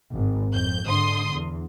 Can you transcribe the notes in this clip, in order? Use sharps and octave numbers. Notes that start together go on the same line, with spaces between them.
G#1
F2 G6
G#2 D3 C6 D#6
E2